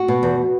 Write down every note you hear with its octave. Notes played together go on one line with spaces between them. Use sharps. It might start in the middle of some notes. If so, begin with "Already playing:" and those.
Already playing: F#4
B2
E2